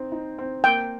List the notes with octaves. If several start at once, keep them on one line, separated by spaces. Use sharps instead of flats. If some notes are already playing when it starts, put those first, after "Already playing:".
Already playing: C4 D#4
D#4
C4
A#3 G5